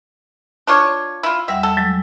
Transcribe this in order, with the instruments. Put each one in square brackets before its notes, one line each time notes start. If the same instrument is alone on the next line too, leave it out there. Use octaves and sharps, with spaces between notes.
[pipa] D4 F4 C#5
E4 F4
[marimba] E2 G3 F#5 [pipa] E5
[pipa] A4
[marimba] F#3 G#3